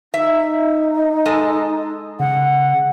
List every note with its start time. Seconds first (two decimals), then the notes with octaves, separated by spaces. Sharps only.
0.14 D#4 E5
1.25 G#3 A4 D#5
2.20 C#3 F#5